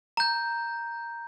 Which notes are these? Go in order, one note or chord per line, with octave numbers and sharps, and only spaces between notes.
A#5 G6